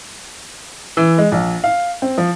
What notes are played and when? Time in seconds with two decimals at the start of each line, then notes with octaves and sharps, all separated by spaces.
0.97 E3
1.18 G#3
1.32 A#1
1.64 F5
2.02 C4
2.18 F3